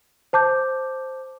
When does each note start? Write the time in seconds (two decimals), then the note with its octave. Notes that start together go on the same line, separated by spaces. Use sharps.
0.33 C5 A5 D6 G6